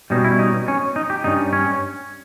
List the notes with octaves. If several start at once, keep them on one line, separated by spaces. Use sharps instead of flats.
B2 G3 C#4 D#4
E4
D#4
C#4
D#4
G4
G2 G3 C#4 D#4
C#4